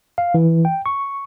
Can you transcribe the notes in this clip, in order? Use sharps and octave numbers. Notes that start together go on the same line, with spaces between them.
F5
E3
G5
C#6